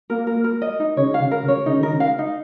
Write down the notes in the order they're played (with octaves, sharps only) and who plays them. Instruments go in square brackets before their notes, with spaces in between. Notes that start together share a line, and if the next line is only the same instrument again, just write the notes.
[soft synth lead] A#3 [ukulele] A#4
[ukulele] A#4
A#4
D#5
D#4
[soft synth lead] C#3 [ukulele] C#5
[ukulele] F5
[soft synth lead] C#3
[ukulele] A#4
[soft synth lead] C#3
[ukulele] C#5
[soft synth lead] C#3 [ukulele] D#4
[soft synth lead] D#3 [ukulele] A#4
[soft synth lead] C#3
[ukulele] F5
D#4